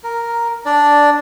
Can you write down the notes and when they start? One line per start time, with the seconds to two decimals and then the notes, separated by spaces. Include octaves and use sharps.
0.04 A#4
0.66 D4 D5